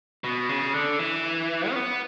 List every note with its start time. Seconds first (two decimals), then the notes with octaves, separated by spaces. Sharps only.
0.24 B2
0.49 C#3
0.74 D3
0.99 E3
1.70 C#4
1.76 B3